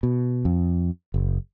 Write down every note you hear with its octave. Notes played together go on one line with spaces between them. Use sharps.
B2
F2
F#1